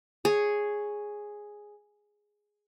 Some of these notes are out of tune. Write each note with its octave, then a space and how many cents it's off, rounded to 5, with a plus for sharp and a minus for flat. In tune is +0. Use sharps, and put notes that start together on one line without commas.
G#4 +0 C#5 +0